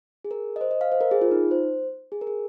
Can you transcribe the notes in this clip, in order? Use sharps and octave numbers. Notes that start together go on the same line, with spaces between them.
G#4
A#4
D#5
C5
D#5
F5
C5
A#4
G#4
F4
D#4
C5
G#4
A#4
G#4